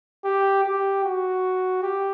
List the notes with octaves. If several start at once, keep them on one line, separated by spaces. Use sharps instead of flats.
G4
G4
F#4
G4